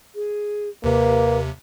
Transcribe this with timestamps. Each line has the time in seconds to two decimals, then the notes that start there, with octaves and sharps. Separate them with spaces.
0.15 G#4
0.84 D#2 C3 A#3 B4